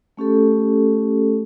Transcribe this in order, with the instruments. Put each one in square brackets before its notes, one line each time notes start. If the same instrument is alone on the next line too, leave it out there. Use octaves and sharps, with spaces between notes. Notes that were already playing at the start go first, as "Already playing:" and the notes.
[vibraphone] A3 C#4 G4 A4